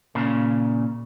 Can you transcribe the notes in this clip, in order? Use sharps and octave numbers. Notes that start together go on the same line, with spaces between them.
A#2 C#3